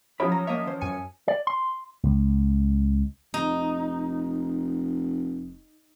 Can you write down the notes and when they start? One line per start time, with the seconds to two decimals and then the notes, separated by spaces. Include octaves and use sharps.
0.20 F3 F#3 C#4 E4 G4 B5
0.32 A#5
0.47 A#3 C#5 D#5 E5
0.66 E3 C5
0.81 F#2 G#5 C#7
1.28 D5
1.47 C6
2.03 C#2
3.34 F1 D#4